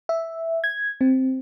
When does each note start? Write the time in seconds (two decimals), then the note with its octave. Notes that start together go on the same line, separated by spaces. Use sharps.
0.09 E5
0.64 G#6
1.01 C4